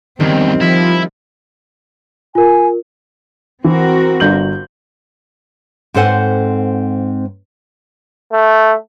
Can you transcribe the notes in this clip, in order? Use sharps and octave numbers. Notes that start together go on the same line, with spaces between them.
E2 G2 D#3 G3 C4
F3 E4
F4 A#4 G#5
E3 C4 F#4 A#4
G1 G6 F#7
G#2 C4 A4 C5 F#5 G#5
A3